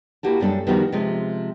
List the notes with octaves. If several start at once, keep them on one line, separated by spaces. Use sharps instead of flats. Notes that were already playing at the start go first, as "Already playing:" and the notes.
A#3 E4 F#4 G4 A5
F#2 G3 A3 C#4 D4 A4
D#3 F3 G3 B3 D#4 F#4
C3 F3 G#3